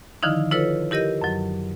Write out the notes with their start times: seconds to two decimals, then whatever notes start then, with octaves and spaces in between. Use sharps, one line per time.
0.23 D3 D#3 F3 D#4 E4
0.51 E4 F4 A4 B4 C#5
0.91 E4 G4 A#4 D#5 G6
1.21 F#2 F#3